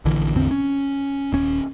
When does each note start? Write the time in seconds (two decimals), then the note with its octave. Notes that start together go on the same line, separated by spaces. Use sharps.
0.05 A#1 D3 E3
0.35 A1 E2 D3 C4
0.51 C#4
1.33 D#1 C#4